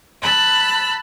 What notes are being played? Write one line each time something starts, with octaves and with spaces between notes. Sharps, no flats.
A5 B5 E6 F#6